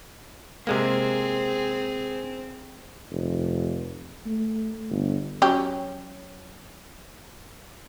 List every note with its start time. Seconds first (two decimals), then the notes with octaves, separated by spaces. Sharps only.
0.67 C3 G#3 A#3 C4 G#4
3.11 F1
4.26 A3
4.91 G1
5.42 F#3 C#4 G4